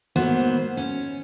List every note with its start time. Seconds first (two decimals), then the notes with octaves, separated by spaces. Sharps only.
0.16 G#2 F#3 A#3 B3 C5
0.77 C#4